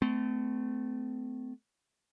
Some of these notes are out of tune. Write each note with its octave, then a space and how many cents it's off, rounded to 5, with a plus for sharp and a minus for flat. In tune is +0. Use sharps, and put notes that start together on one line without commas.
A3 -10 C4 -40